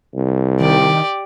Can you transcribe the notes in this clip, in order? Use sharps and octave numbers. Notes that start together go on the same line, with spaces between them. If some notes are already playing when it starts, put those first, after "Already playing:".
C2
D#3 G4 D5